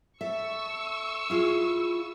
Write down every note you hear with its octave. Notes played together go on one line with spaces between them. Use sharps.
A4 E5 C#6 E6
E4 F4 G#4